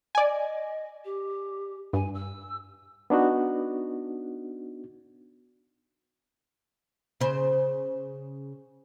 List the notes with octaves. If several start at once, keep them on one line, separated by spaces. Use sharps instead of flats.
D5 D#5 G#5
G4
G2 G#5
E6
B3 D4 D#4 F#4
C#3 C5